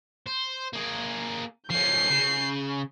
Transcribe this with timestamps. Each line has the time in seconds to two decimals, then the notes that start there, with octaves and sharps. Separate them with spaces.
0.27 C5
0.73 A#3 G#4
1.70 F3 C#4 G6 C7
2.10 C#3